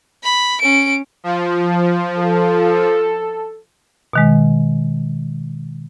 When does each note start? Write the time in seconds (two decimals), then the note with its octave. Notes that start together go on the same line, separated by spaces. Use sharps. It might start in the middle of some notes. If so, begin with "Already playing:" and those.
0.24 B5
0.61 C#4 D7
1.24 F3
2.17 A4
4.13 B2 D#3 G#3